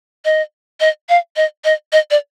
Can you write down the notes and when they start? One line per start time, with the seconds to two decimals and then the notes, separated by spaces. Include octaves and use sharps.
0.25 D#5
0.80 D#5
1.09 F5
1.36 D#5
1.64 D#5
1.92 D#5
2.11 D5